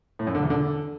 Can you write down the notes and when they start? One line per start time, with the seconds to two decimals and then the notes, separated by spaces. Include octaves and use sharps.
0.19 A2
0.27 F#2
0.35 D3
0.42 E2
0.50 D3